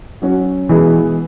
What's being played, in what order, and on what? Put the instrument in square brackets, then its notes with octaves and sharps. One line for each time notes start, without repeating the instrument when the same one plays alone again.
[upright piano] F#3 C#4 F#4
[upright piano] B2 G#3 B3 E4 G#4 [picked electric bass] E3